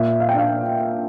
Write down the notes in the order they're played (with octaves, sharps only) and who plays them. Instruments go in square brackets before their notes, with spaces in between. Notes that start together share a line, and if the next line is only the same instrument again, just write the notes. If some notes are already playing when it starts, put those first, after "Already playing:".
Already playing: [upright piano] A#2 E5
F5
G5
D4 F5